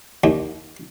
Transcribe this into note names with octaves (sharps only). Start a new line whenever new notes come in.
D#2